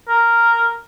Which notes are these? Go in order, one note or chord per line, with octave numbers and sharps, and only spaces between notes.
A#4